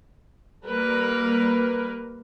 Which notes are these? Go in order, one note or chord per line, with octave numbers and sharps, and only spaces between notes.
G3 A#3 A#4 B4